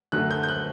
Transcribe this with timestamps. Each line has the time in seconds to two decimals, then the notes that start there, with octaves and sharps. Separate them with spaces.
0.12 F#2 D3 F#3 A3 F#6
0.31 G6
0.43 G6
0.49 F#6